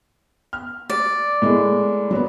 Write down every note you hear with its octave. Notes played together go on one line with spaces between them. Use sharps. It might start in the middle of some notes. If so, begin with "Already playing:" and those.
F6
D5
A2 G#3 A#3
F#3 B3